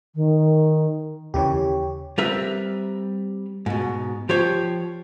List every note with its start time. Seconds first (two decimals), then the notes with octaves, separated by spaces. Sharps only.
0.15 D#3
1.34 D#2 C#3 E3 G4 C#5
2.18 G3 C4 A#4 B4 E5
3.66 G#2 B2
4.29 F3 G4 C5 C#5